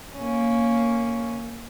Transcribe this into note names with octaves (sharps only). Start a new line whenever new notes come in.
A#3 C#4